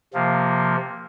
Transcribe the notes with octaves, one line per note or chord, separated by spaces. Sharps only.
C3 F3 A#3